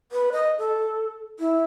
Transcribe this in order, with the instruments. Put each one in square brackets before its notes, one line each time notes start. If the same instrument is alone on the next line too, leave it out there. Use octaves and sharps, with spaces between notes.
[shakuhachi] B4
D#5
A4
E4